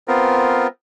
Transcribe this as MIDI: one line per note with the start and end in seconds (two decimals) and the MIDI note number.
0.08 0.67 59
0.08 0.67 60
0.08 0.67 65
0.08 0.67 70